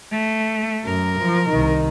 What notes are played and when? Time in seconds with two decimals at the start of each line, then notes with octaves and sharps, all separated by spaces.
0.12 A3
0.85 F#2 A#4
1.21 F3
1.50 C2 D#3